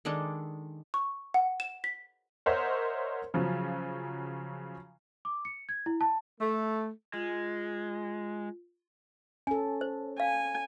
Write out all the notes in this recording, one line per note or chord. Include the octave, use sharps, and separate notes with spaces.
D#3 G#3 D4 A4
C#6
F#5
E7
B6
A#4 C5 C#5 D#5 E5 F#5
C#3 F3 F#3
D6
C#7
G#6
E4
A5
A3
G#3 F4
C#4 A4 G#5
C5
F5 G#5